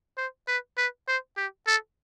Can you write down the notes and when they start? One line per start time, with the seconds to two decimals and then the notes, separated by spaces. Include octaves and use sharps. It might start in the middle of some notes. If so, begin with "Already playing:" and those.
0.17 C5
0.48 B4
0.78 B4
1.08 C5
1.37 G4
1.67 A4